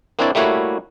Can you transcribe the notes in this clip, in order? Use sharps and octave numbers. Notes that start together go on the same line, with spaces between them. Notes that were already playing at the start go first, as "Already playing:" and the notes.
A#3 C4 D4 E4 C#5 D5
G3 A3 A#3 E4 F#4 C#5